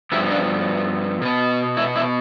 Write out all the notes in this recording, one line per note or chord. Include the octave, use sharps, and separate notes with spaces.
G2 F3 B3 E4 G4
D4 F4
B2 B3
E4
E4